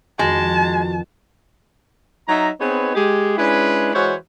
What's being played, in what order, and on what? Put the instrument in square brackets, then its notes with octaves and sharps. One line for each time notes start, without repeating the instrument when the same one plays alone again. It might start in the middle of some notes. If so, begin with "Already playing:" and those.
[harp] F2 D#3 B3 [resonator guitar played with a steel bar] G#3 [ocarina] F#4 [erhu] A5
[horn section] F#3 D#4 E5 A#5
B3 C4 D#4 G#4 B4 C#5
G#3 G4 G#4
G#3 C#4 D4 E4 B4
E3 G#3 F#4 C5 C#5